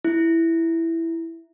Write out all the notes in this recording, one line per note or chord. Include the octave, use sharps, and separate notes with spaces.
E4